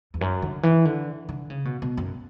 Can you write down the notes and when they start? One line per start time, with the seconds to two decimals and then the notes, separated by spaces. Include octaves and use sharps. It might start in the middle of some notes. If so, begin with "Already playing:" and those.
0.14 E2
0.21 F#2
0.42 D3
0.63 E3
0.85 D3
1.29 D3
1.50 C#3
1.65 B2
1.82 B2
1.97 F#2